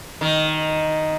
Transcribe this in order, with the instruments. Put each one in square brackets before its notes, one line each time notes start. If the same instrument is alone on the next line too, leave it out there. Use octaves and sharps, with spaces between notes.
[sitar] D#3